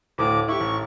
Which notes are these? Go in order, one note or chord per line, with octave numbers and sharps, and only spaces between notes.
D2 A2 F5 D6
E4 G4 C#6
A1